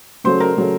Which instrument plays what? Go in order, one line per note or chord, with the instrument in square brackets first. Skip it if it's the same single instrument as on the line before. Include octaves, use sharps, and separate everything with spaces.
[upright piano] C#3 F#3 A3 [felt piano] C5 C6
[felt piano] A#4 A#5
[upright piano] C#3 F#3 A3